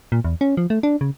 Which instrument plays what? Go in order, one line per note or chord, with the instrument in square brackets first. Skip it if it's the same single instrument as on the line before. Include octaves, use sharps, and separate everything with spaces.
[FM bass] A#2
E2
C#4
F3
A3
D4
C#3